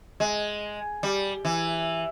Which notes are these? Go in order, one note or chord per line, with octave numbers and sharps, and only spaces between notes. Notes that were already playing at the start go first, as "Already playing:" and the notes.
G#3
G3
E3